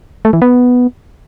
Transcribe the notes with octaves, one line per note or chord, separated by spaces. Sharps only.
A3
E3
B3